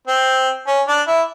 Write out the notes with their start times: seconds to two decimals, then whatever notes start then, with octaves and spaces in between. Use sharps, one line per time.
0.07 C4
0.67 C#4
0.88 D4
1.07 E4